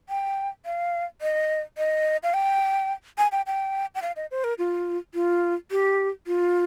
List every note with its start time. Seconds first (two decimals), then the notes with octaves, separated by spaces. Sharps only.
0.09 G5
0.65 F5
1.22 D#5
1.78 D#5
2.23 F5
2.34 G5
3.18 G#5
3.32 G5
3.47 G5
3.95 G5
4.02 F5
4.16 D#5
4.31 C5
4.44 A#4
4.58 F4
5.14 F4
5.71 G4
6.27 F4